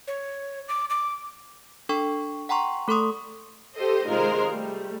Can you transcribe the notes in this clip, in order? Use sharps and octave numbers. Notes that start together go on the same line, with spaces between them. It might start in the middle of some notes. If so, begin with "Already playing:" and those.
C#5
D6
D6
D4 A4 G5 C#6
F#5 G5 A#5 C6 C#6
A3 A4 A#5 C6 C#6 D#6
G4 A4 C5 D#5
C3 D#3 G#3 F4 A#4 C5
G3 A3